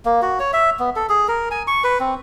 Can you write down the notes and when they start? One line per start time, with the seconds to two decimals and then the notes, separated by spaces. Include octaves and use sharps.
0.05 A#3
0.22 F#4
0.40 C#5
0.53 E5
0.79 B3
0.96 A4
1.09 G#4
1.28 A#4
1.51 G#5
1.67 C#6
1.84 B4
2.00 C4